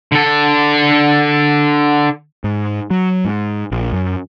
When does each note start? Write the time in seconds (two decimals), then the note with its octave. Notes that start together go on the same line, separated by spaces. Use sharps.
0.12 D3 A4
2.44 G#2
2.91 F#3
3.25 G#2
3.72 A#1
3.92 F#2